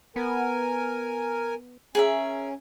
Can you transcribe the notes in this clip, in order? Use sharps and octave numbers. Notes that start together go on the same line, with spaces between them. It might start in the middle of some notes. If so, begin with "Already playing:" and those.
B3 A#4 G#5
C#4 G#4 A#4 E5